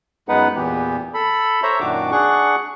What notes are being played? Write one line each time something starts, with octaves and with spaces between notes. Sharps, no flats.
F#2 G#3 B3 D#4 B4 F#5
E2 A#2 E3 B3 G4
A4 B5
C5 C#5 E5 A#5
F#2 A#2 D#3 D4 F#4 D6
D4 G#4 F#5 C#6